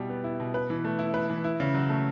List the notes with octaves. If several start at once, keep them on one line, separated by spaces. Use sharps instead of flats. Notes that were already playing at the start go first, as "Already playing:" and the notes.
Already playing: B2 G3 E4
B3
E4
B2
B4
E3
A3
E4
B4
E3
E4
C#3
F#3
A3